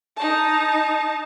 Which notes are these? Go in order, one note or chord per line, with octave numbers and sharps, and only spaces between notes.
D#4 A5